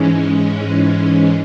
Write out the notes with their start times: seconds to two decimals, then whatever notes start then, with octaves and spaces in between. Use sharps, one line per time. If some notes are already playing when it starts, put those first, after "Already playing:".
Already playing: G#2 E3 G#3 C#4